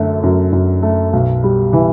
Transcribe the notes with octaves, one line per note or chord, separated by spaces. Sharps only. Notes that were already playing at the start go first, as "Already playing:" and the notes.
Already playing: F#2 D3 A3
F#2
F#2
A3
B1
G3
E3